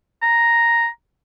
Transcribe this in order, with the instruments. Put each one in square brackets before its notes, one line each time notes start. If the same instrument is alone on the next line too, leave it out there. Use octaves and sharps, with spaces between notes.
[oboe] A#5